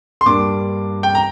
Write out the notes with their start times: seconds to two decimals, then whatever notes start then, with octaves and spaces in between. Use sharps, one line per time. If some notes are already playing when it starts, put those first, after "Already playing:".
0.21 C6
0.26 G2 G3 A#3 D4 D6
1.03 G5
1.15 A#5